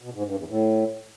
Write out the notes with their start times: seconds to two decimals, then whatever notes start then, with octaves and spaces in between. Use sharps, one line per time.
0.02 B2
0.14 G#2
0.25 G2
0.37 E2
0.49 A2